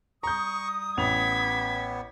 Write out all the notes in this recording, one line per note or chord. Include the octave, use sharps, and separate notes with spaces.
G3 A#5 C#6 D#6 G6
A1 B3 G#6 B6 F7